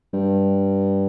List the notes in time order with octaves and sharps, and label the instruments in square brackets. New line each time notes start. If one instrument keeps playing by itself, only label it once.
[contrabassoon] G2